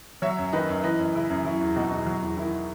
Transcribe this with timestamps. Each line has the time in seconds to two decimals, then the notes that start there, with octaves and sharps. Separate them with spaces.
0.22 F#3 C#5 E5
0.38 F#2
0.52 D#3 B4 D#5
0.68 F#2
0.84 E3 B4 D#5
0.99 F#2
1.15 C#3 E4
1.30 F#2
1.45 F#3 E4
1.61 E2
1.76 B2 D#4 F#4
1.91 E2
2.06 F#3
2.22 E2 E4
2.37 D#3 E4